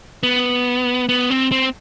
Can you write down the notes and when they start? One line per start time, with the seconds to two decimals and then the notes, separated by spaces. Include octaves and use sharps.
0.23 B3
1.09 B3
1.30 C4
1.52 C4